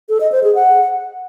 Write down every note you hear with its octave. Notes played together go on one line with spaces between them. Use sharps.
A4
D#5
C5
G#4
F#5